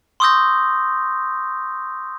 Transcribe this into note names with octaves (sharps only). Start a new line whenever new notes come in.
C6 C#6 D#6 E6 G6 A#6